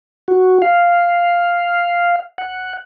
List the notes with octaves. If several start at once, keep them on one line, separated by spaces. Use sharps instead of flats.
F#4
F5
F#5